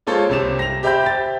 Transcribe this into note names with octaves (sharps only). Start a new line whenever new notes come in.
G#3 A#3 F4 A4 C5 C#5
C2 C3 E7
A#6 F7
G4 C5 E5 G5 B5 G6
A6